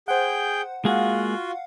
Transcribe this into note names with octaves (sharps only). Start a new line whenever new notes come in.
G#4 C5 F#5 G5 G6
G#3 A#3 F4 F#4 G#4 F5 F#5